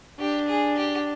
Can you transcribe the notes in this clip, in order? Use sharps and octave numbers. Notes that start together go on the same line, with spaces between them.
D4 G4
G#4
G4